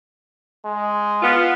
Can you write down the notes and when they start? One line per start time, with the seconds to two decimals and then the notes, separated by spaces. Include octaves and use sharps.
0.64 G#3
1.22 B3 F4